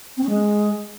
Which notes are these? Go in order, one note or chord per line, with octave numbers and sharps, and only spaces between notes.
C4
C#4
G#3